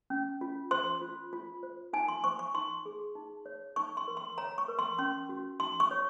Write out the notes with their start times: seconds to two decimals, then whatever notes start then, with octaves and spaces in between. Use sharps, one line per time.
0.10 C#4
0.41 F4
0.71 C5 C6
1.01 F4
1.33 F4
1.63 C5
1.93 D#4 G#5
2.08 C6
2.24 C5 C#6
2.39 C#6
2.55 D#4 C6
2.86 G#4
3.15 D#4
3.46 C#5
3.76 D#4 C#6
3.97 C6
4.08 A#4
4.17 C6
4.38 C#5 A#5
4.58 C#6
4.68 A#4
4.79 C6
4.99 C#4 C6
5.29 F#4
5.60 D#4 C6
5.80 C#6
5.91 C#5